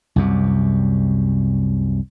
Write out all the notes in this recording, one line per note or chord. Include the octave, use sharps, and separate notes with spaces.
C2 F#2 C3